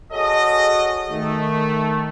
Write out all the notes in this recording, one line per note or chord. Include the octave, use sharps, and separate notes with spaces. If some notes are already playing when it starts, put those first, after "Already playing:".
F#4 G#4 A4 C#5 D#5
D#3 A3